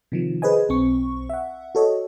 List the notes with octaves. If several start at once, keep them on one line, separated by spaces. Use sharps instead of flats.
C3 D#3 F3
G#4 B4 C5 D#5 G#5
B1 C4 C#6
E5 F#5
F#4 A4 C#5 D#5